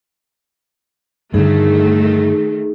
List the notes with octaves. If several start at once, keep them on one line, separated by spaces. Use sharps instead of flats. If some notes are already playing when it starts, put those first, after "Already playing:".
G2 D3 D#3 A3 D#4 G#4